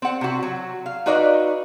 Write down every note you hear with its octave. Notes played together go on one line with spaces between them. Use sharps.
C4 F#5
C3 F#4
F#3
F5
D#4 F#4 B4 D5 D#5 F5